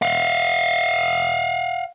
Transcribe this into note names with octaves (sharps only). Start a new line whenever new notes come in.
F5 F#5